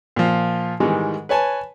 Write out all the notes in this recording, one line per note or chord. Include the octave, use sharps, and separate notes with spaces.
A#2 F3
G#2 D#3 E3 G3 G#3
B4 C#5 G#5 A5